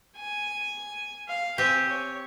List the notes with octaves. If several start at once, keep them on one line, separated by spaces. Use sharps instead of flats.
G#5
F5
C4 G4 G#5
C#5